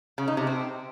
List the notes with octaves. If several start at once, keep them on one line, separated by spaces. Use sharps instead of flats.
C#3
D#4
C3
C4